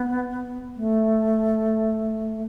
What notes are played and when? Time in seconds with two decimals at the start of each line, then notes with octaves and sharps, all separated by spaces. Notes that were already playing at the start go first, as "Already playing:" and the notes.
Already playing: B3
0.76 A3